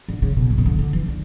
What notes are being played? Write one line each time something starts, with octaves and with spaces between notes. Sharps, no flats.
D3
C#3
B2
A2
C#3
D3
D3
E3
D3